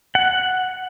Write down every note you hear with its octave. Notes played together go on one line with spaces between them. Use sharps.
F#5